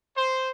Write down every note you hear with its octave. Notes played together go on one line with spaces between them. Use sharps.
C5